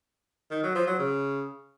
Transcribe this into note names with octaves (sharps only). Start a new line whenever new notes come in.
D#3
F#3
F3
F#3
C#3